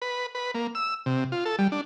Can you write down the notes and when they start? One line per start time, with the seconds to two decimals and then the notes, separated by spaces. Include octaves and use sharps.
0.02 B4
0.35 B4
0.54 A#3
0.75 E6
1.06 C3
1.32 F4
1.45 A4
1.59 G3
1.72 D4